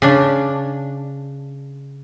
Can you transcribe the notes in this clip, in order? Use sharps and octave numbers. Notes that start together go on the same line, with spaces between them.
C#3 D4